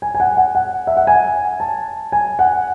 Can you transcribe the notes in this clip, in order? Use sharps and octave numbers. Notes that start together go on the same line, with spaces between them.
G#5
G#5
F#5
F#5
F#5
E5
F#5
G#5
A5
G#5
F#5